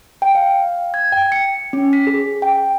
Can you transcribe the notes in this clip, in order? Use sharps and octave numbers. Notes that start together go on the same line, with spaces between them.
G5
F5
G#6
G5
C#7
C#4
B6
G#4
G5